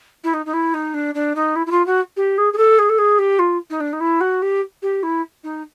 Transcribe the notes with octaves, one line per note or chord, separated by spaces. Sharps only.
E4
D#4
D#4
E4
D#4
D4
D4
D#4
E4
E4
F4
F#4
G4
G#4
G#4
A4
G#4
A4
G#4
G4
F4
D#4
D4
D#4
E4
F#4
G4
G4
E4
D#4